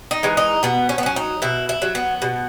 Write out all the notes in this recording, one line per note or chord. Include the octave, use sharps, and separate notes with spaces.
D#4
E3 G#3
D#4
B2 B3
C#4
B3
F#3 C#4
D#4
B2 E4
E4
F#3
B3
B2